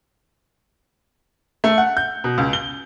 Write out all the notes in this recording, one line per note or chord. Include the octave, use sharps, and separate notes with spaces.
A3
F#5
G6
B2
C#2
G7